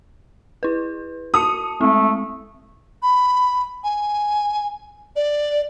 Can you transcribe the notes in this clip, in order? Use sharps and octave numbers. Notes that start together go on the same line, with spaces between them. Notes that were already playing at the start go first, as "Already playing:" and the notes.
E4 B4
F#4 A5 D#6 C#7
G#3 A3 C4
B5
G#5
D5